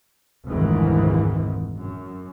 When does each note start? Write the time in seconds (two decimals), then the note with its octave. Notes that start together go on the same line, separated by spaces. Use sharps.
0.47 F1 D2 G#2 D#3 E3
1.81 F#2